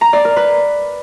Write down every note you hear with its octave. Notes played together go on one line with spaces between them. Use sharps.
A#5
D5
A#4
B4